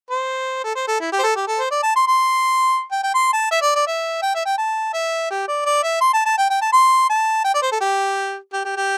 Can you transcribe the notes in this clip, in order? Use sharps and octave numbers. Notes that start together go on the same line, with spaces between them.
C5
A4
C5
A4
E4
G4
C5
A4
G4
A4
C5
D5
A5
C6
C6
G5
G5
C6
A5
E5
D5
D5
E5
G5
E5
G5
A5
E5
G4
D5
D5
E5
C6
A5
A5
G5
G5
A5
C6
A5
G5
D5
C5
A4
G4
G4
G4
G4